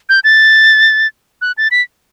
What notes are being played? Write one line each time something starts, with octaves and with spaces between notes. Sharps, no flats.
G6
A6
F#6
A6
B6